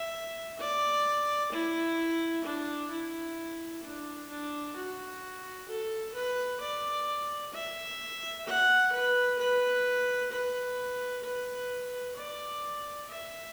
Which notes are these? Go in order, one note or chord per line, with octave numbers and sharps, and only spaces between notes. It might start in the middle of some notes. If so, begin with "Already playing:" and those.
Already playing: E5
D5
E4
D4
E4
D4
D4
F#4
A4
B4
D5
E5
F#5
B4
B4
B4
B4
D5
E5